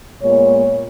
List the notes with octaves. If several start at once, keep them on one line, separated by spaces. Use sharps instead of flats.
A#2 G#3 B3 C#5